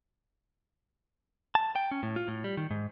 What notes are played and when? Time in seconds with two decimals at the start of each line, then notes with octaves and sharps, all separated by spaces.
1.55 A5
1.76 G5
1.91 C#4
2.03 A2
2.16 F4
2.28 A2
2.44 G3
2.57 D#3
2.71 G#2